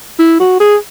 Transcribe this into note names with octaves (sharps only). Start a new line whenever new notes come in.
E4
F#4
G#4